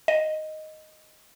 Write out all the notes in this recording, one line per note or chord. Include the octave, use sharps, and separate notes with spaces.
D#5